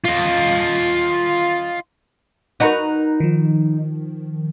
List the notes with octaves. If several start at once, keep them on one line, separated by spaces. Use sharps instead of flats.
F4 D#5
D#4 F#4 A#4 B4 A#5 F#6
D#3 F3